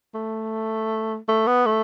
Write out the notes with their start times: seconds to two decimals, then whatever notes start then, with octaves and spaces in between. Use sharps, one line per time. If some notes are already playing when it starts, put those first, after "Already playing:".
0.14 A3
1.28 A3
1.47 B3
1.66 A3